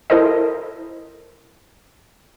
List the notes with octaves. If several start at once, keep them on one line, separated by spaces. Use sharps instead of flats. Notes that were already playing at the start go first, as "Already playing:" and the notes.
E4 A4 A#4 C5 D#5